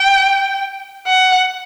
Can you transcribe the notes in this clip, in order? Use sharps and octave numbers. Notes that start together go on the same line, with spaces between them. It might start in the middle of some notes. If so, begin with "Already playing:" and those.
Already playing: G5
F#5